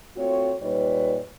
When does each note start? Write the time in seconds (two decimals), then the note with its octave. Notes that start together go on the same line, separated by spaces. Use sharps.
0.17 A3 C4 F4 F#4 C#5
0.62 A#2 G3 D#4 B4 C#5